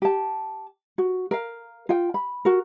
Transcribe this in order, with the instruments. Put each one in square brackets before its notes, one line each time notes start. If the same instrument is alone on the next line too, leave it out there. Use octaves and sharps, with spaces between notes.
[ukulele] G4 A5
F#4
A#4 F5
F4 G5
B5
F#4 A#4